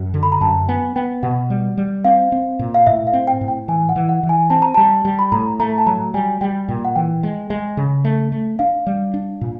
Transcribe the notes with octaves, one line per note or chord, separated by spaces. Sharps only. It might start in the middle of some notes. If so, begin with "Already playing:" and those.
Already playing: F#2
D3
B5
A#5
F#2 A5
B3 G#5
B3 G5
B2 F#5
G3
G3
C4 F5
C4
A#2
F5
A2 E5
F5
C4
G5
A2
G5
E3 G#5
F#5
E3
F#5
E3
G#5
C4 A5
A#5
G3 A5
G3
B5
A2 A#5
A3 A#5
A5
F#3 A#5
G3 G#5
G3 G5
A#2 G5
F#5
E3 G5
G#3
G#3
C#3
A3
A3
D4 F5
G3
D4
A#2